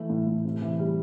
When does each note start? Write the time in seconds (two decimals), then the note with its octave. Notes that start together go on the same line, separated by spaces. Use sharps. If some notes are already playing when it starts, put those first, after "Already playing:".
Already playing: E3 A3
0.10 A2
0.27 A2
0.45 C3
0.62 E3
0.79 G3